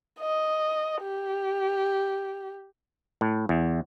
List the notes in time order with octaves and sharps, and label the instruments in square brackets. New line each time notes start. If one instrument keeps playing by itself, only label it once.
[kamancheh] D#5
G4
[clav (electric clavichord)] A2
E2